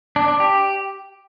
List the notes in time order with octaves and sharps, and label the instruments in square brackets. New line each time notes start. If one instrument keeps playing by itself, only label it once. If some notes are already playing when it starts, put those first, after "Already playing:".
[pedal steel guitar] D4
D4
G4